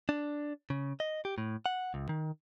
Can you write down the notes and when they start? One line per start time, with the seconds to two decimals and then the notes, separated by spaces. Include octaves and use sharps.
0.09 D4
0.70 C#3
1.00 D#5
1.25 G4
1.38 A2
1.66 F#5
1.94 C#2
2.09 D#3